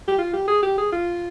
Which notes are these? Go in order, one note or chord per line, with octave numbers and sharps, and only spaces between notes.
G4
F4
G4
G#4
G4
G#4
F4